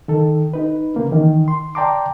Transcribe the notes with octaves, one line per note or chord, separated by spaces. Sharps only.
D#3 A4
D#4 B4
C#3 A#3 C#4
D#3 E3
C6
D5 G5 A5 A#5 C6 D6